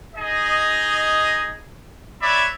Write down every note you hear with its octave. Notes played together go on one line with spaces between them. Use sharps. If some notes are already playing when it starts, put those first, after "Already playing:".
D#4 G#4 D#5
B4 C#5 D5 E5 B5